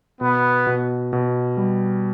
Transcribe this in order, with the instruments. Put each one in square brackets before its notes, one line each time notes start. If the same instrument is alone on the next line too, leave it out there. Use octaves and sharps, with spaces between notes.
[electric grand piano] B2 [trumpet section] B3
[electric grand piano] B2
B2
G3